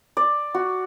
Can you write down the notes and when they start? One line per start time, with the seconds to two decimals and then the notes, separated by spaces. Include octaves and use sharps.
0.17 D5
0.54 F#4